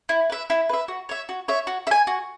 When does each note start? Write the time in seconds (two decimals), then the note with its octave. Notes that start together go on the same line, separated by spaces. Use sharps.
0.09 E4
0.30 B4 E5
0.50 E4
0.69 B4 E5
0.88 F#4
1.09 C#5 E5
1.29 F#4
1.48 C#5 E5
1.67 F#4
1.87 E5
1.91 G#5
2.07 F#4